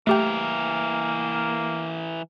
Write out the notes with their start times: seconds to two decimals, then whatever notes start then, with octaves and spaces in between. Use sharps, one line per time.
0.07 E3 A3 A#3 G4 A#4 G5